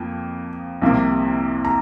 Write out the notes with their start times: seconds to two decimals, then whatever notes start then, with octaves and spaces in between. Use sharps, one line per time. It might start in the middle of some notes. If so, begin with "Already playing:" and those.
Already playing: F2 F3 A#3
0.82 C2 C3 F3 A#3
1.65 A#5